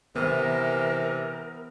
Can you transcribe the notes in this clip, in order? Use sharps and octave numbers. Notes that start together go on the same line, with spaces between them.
C3 E3 B3 A#4 F6